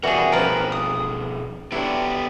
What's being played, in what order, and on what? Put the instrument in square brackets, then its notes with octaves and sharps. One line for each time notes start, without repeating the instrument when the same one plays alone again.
[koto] B2 E3 G3 [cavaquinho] F#4 G#4 [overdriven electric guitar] A#4 E5
[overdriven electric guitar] B2 F3 [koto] C4 C#4 F4 [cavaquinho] A#4 B4
[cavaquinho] D#6
[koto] D3 F#3 E4 [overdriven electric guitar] B3 G4